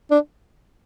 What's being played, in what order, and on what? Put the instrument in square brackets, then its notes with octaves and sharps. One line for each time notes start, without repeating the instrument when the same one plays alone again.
[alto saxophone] D4